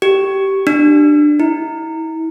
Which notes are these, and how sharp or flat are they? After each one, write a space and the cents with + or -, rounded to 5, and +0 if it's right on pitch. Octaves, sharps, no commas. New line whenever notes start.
G4 -15
D4 +15
E4 -35